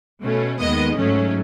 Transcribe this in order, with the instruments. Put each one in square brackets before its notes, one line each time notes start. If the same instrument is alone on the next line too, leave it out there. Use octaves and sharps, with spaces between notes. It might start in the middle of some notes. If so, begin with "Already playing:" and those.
[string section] B2 A3 C#4
D#2 D#3 G#3 B3 D#5
G#2 F#3 A3 C#4